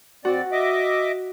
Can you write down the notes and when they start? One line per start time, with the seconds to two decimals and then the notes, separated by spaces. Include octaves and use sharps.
0.25 F2 C4 F#4 D5
0.52 D#5 E5 D6